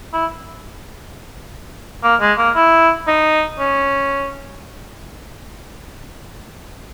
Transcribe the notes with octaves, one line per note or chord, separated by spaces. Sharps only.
E4
A#3
G#3
A#3
E4
D#4
C#4